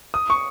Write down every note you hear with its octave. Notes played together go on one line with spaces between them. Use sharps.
D#6
C#6